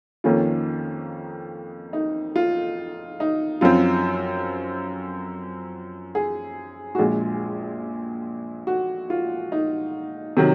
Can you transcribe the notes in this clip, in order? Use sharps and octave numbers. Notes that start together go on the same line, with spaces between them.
F2 D#3 A#3 C#4 F4
D#4
F4
D#4
F#2 F3 C4 F4
G#4
F#4
A#1 A#2 G#3 G#4
F#4
F4
D#4
C3 D#3 F#3